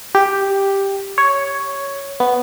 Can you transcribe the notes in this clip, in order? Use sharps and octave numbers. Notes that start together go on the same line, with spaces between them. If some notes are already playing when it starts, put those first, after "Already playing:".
G4
C#5
B3